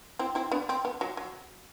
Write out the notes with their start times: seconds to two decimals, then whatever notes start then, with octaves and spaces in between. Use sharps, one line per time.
0.19 C4 E4
0.35 C4 E4
0.52 B3 D4
0.69 C4
0.85 B3
1.01 F#3
1.17 F#3